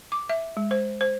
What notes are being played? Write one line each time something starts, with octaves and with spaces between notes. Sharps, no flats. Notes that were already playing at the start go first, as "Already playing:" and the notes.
D6
E5
G#3
C5
C5